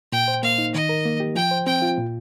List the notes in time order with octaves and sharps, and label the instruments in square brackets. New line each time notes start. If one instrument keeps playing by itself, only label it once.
[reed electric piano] A#2 [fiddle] G5
[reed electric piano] C5
[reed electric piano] A#3 [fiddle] F5
[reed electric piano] D#4
[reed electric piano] D#3 [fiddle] D#5
[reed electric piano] A#4
A#3
G4
[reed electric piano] F3 [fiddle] G5
[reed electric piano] C5
[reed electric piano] C4 [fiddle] G5
[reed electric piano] F4
A#2